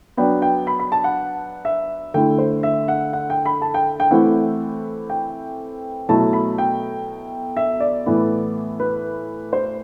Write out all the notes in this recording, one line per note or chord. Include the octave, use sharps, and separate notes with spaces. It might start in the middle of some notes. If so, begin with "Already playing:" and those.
F#3 B3 D4 G5
G5
B5
B5
A5
F#5
E5
D3 A3 E4 G5
C5
E5
F#5
F#5
G5
B5
A5
G5
G5
E3 A3 C4 E4 F#5
G5
B2 F#3 A3 E4 A5
B5
G5
E5
D5
A2 E3 B3
B4
C5